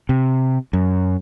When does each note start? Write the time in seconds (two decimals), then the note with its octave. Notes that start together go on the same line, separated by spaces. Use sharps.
0.09 C3
0.73 F#2